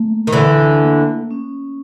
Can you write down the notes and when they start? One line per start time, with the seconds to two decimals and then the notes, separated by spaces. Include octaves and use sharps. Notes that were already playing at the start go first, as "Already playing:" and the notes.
Already playing: A3 A#3
0.27 D#3
0.32 D3 E3
0.82 A#3
1.31 C#4